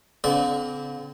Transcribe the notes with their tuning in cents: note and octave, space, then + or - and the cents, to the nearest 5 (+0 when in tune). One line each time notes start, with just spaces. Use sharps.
D3 -45 C4 -40 D5 -25